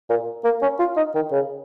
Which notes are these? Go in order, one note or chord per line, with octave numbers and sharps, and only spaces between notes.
A#2
A#3
C#4
F4
D#4
D#3
C#3